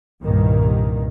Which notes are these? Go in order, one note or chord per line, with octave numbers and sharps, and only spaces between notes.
C2 G2 A#2 D#3